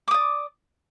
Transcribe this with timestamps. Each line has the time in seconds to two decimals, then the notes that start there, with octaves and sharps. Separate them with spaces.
0.08 D6
0.11 D#6
0.14 D5